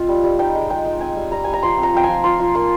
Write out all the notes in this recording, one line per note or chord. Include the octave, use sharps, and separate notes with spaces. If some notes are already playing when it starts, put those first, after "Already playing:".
Already playing: C4 F4 D#5
G3
G3
D#4 G5
G#3
G#3 G5
D#4
C4 G#5
G3
G3 A#5
G3 G#5
A#5
F3 C6
C4
A#5
F3 G5
F3 G#5
F4 C6
F4
A#3 C6